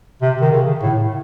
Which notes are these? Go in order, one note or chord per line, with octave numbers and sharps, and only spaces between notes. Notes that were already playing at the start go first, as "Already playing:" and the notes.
C3
D#3
C#3
A2